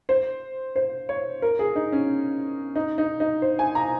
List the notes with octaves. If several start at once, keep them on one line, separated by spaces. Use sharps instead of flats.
C5
C5
C#5
A#4
G#4
D#4
C#4
D#4
D#4
D#4
C5
G#5
A#5